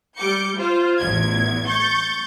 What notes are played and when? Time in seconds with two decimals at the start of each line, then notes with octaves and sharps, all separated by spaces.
0.17 G3 D6 G6 C#7
0.58 F4 C5
0.99 A1 E2 G#6
1.67 C#6 G6 A6